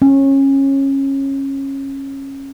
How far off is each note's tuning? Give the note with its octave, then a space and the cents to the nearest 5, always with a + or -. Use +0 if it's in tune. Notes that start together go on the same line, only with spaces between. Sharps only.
C#4 -20